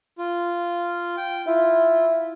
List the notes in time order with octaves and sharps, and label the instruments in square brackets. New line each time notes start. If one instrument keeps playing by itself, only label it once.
[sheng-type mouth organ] F4
G5
[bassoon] E4 [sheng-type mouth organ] F4